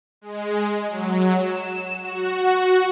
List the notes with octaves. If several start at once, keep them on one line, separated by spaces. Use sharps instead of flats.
G#3
F#3
E7
F#4